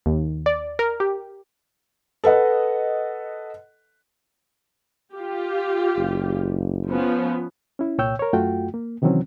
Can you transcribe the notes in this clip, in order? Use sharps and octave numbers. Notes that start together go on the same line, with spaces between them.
D#2
D5
A#4
G4
A4 B4 D#5 F#5
F4 G4
F#1
F3 B3 C#4
C#4 E4
C2 A#2 C#5 G5 E6 G6
A#4 C#5
F#2 A3 F4 F#4 G5
A#3
C3 D#3 E3 F#3 C4 C#4